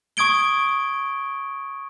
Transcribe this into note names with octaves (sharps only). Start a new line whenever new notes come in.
C#6 D#6 G#6 D7 G7